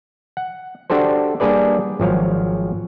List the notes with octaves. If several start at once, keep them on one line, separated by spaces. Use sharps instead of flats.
F#5
D4 F#4 G4 A4 C5
G3 A#3 D4 G#4 B4 D5
G#1 F3 F#3 F5